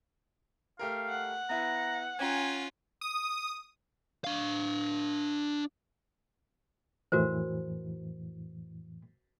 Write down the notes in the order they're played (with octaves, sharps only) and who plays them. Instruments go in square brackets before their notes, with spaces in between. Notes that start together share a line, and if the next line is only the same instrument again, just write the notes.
[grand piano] A3 G4 A#4 [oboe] F5
[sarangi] F#5
[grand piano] B3 E4 [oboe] A#5
[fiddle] C#4 F4 [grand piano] G5 A#5 [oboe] G#5
[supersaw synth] D#6
[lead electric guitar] D4 F5
[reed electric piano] F2 A2 E3 [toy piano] F#4 A#4 C5